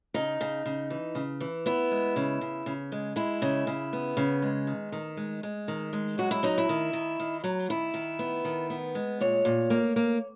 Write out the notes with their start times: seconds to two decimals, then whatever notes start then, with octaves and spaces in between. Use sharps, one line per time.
0.14 C#3 D#4
0.41 C#3
0.66 C#3
0.90 E3
1.15 C#3
1.40 E3
1.66 B3 E4
1.91 G#3
2.16 C#3
2.41 C#3
2.66 C#3
2.92 G#3
3.16 G#3 E4
3.42 C#3
3.67 C#3
3.93 B3
4.17 C#3
4.42 G#3
4.67 D#3
4.92 D#3
5.17 G#3
5.43 G#3
5.68 D#3
5.93 G#3
6.18 F#3 F#4
6.31 E4
6.43 F#3 D#4
6.58 E4
6.69 D#3
6.93 D#3
7.20 D#3
7.44 F#3
7.70 D#3 E4
7.94 D#3
8.19 B3
8.45 D#3
8.70 B3
8.95 G#3
9.21 A#2 C#5
9.45 A#2
9.70 A#3
9.96 A#3